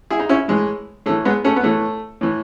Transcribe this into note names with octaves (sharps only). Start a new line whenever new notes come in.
E4 G#4
D#4
C#4 E4
A2 E3 G#3
A2 E3 A3
G#3 B3
A3 C#4
B3
A2 E3 A3
A2 E3